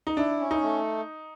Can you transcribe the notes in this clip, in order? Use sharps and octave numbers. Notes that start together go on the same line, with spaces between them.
D#4
D4 E4
C#4
D#4
A3